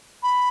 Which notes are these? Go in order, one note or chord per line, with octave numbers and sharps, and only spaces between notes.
B5